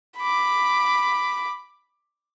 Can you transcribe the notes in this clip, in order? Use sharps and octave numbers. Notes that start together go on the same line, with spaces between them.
B5 D6